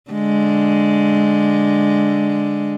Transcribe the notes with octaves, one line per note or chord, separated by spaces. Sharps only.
D3 G#3